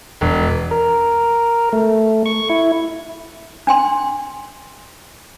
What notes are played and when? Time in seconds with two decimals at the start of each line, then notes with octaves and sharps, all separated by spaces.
0.21 E1
0.71 A#4
1.73 A3
2.26 C#6
2.50 E4
3.67 D4 G5 C6